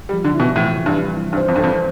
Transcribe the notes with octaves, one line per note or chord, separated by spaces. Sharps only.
G3
F3
D3
B2 E4
A2 E3
C3
G2
G3
E4
G2
C5
F2
G2 A4
F2